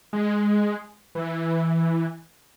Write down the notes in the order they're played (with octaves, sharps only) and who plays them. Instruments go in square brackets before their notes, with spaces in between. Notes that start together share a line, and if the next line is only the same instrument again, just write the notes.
[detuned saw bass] G#3
E3